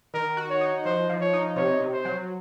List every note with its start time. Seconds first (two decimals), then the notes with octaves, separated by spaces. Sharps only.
0.14 D#3 A#4
0.37 F#4
0.50 C#5
0.61 D#4
0.85 F3 C5
1.09 F3
1.21 C#5
1.33 D#4
1.56 C3 C#5
1.80 C3
1.92 C5
2.05 F#3